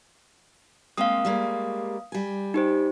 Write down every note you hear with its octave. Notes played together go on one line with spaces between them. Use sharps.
G#3 A#3 C4 F5 D#6
G3 G#3 A#3
G3 G#5
D#4 G4 C5